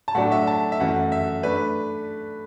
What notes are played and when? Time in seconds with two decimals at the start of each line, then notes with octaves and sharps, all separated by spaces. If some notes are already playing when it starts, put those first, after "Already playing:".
0.08 A5
0.15 A2 F#3 A3 D4 F#5
0.32 E5
0.47 A5
0.72 E5
0.80 F#2 E3 A3 F#5
1.12 E5
1.43 A3 D4 B4